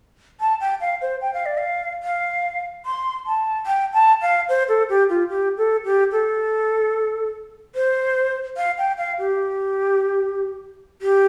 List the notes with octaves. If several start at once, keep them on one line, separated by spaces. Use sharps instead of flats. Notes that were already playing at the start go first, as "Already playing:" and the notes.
A5
G5
F5
C5
G5
F5
D5
F5
F5
C6
A5
G5
A5
F5
C5
A4
G4
F4
G4
A4
G4
A4
C5
F5
G5
F5
G4
G4